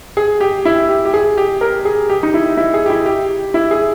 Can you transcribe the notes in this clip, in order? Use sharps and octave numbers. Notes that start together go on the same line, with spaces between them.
G#4
G4
E4
G4
G4
G#4
G4
A#4
G#4
G4
D#4
E4
E4
G#4
G4
E4
G4
E4
G#4